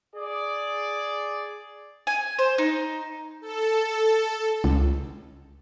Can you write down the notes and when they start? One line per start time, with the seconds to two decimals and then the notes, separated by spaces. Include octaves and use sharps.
0.16 G#4 D5
2.07 G#5
2.39 C5
2.58 D#4
3.41 A4
4.64 C#2